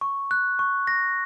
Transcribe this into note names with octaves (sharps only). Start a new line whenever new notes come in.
C#6
F#6
C#6
A#6